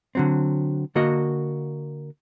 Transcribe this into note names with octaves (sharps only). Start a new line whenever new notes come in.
D3 F#3 C4
D3 A#3 F#4 D#5